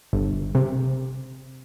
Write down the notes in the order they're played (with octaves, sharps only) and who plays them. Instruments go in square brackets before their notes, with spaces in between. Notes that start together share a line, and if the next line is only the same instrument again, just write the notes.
[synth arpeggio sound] G1
C3